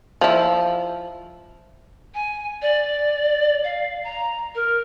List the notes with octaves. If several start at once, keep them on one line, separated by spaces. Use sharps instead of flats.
F3 E4
G#5
D5
F5
A#5
A#4